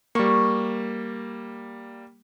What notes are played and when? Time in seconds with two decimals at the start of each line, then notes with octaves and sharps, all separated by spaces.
0.15 G3 A#3 C#6